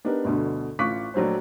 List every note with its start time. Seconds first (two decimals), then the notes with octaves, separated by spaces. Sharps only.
0.05 B3 D4 D#4 G4 A#4 B4
0.24 G1 D2 B2 D3
0.79 A1 F4 C#6 D6 F#6 B6
1.14 A#1 F#3 A3 C5